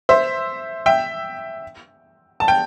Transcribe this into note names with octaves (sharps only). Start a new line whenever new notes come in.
C5 E5
E5 G5
A5
G5